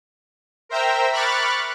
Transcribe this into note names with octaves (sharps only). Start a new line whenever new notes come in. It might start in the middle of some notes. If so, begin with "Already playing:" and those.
A#4 C5 E5 G5 A#5 E6
B5 C#6 D6 F6 F#6 A6